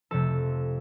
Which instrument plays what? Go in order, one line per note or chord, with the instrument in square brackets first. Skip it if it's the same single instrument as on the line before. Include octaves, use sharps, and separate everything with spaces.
[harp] F2 C3 F3 A3 A4